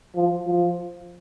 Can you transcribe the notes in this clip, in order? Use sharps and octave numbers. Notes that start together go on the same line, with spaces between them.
F3
F3